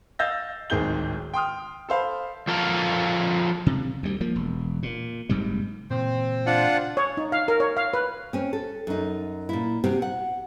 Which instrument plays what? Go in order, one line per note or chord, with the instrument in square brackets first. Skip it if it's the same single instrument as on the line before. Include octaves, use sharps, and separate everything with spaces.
[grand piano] D#5 F5 E6 G6 A6 A#6
D1 G#1 D#3 G#4 G6 G7
G5 C6 D#6 F6
A4 C5 F5 B5
[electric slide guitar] F3 A4 A#4 F5
[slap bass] C3
D2 G3
F3 A#3
E1
A#2
F#1 G#2 C3 G3
[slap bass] A#2 C#3 E3 [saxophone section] C4
[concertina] D4 F4 F#5
[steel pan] C#5
D#4
F5
A#4
C#5
F5
B4
[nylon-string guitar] C4 C#4
A4
F#2 D#4
A#2 E4
C3 C4 F#4
F#5